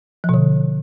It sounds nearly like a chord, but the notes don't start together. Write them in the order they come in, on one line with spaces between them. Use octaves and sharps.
F3 B2 D3